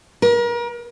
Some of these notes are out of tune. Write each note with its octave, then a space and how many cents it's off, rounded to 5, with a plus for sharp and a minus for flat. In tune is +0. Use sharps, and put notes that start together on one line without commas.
A#4 +35